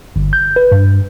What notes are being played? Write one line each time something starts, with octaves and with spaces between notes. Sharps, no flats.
G1
G6
B4
G2